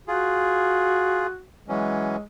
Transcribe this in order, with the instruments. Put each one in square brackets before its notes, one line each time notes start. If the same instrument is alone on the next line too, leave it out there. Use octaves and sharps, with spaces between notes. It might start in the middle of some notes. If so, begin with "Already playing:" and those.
[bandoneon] F4 G#4 [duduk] F#4
[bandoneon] E3 F#3 C#4 [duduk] G#3